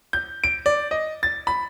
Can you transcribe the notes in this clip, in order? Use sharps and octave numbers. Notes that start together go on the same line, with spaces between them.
G6
D7
D5
D#5
A6
B5